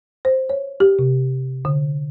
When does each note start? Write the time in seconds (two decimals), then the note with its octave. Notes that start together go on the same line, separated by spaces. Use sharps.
0.25 C5
0.49 C#5
0.80 G4
0.99 C3
1.65 D3